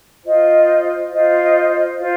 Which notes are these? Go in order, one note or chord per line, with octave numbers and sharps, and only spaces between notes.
F4 C5 D#5
F4 C5 D#5
F4 C5